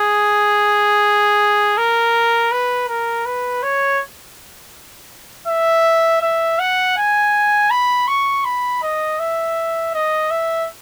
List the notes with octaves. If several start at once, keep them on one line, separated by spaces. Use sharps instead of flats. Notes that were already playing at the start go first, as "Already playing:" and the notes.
Already playing: G#4
A#4
B4
A#4
B4
C#5
E5
E5
F#5
G#5
B5
C#6
B5
D#5
E5
D#5
E5